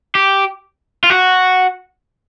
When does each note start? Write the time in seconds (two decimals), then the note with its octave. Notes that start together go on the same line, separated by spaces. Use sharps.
0.15 G4
1.04 F4
1.10 F#4